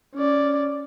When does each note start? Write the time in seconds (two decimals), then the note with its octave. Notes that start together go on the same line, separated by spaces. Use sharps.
0.16 C#4 D5